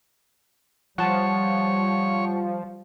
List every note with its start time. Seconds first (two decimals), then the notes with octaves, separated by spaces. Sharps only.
0.98 F3 G3 C#5 F#5 A5